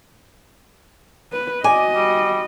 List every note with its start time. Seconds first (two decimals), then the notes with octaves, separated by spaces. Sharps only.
1.32 B4
1.64 F#4 D5 D#5 G#5
1.95 G3